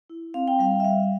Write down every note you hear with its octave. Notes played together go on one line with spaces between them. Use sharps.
E4
C4 F5
G5
G3 F5
E5
G3 F5